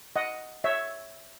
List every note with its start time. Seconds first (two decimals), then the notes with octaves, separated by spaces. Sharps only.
0.16 D#5 F#5
0.64 C#5 E5